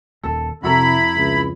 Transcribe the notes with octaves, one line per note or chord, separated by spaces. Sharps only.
D#1 D#2 A4
F2 C3 E4 F#4 A4 A#5 B5
C#2